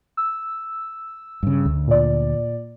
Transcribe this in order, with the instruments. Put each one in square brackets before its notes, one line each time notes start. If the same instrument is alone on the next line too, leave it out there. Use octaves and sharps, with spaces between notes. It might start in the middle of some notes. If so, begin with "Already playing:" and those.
[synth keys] E6
[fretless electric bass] G2 C#3
D2
[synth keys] A#2 D5